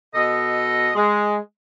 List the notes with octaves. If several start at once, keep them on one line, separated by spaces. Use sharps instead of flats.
B2 A4 D#5
G#3